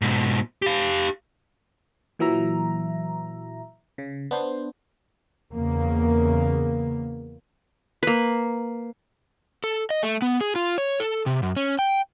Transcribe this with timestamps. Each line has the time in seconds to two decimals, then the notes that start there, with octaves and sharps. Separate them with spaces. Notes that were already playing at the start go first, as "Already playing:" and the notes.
0.02 G#2 B2
0.62 G4 F5
2.19 A#2 E3 F#3 E5 A#5
3.98 C#3
4.31 B3 D4 C5
5.53 E2 C#3 A#3
8.03 A#3 B4
9.64 A4
9.90 D#5
10.03 A3
10.22 B3
10.41 G#4
10.56 F4
10.78 C#5
11.00 A4
11.26 C3
11.43 F#2
11.57 C#4
11.79 G5